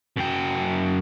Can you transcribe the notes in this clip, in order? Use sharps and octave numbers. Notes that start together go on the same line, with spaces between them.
F#2 G5